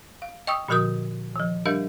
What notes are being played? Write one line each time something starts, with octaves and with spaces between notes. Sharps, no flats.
F5
D#5 G5 C#6 D#6 E6
A#2 D3 F3 F#4 A#4 D#6
D#3 F3
G3 D4 G4 A#4 D#5 F5